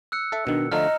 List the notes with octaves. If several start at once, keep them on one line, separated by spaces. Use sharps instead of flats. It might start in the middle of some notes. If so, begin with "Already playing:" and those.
E6 F#6 C#7
A4 E5
B2 D#3 D4
D3 F3 A3 D#5 A#5 F6